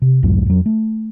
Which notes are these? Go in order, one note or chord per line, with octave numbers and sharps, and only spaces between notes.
C3
C2 F2 G#2 F#3
F2 F#3
A3